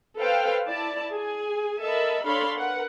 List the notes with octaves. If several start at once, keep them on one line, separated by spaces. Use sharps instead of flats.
A4 B4 C5 F5 G5
E4 D5 A5
G#4 G#5
A4 A#4 D#5 E5 A5 B5
D4 A4 C#5 F5 B5 C6
A#4 B4 F#5